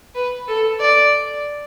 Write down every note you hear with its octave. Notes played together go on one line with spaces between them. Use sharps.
B4
A4
D5